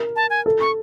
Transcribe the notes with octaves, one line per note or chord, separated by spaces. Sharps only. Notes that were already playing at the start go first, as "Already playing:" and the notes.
Already playing: A#4
A5
G#5
A4
C#6